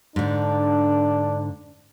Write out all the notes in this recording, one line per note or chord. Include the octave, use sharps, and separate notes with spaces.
G#2 D3 D4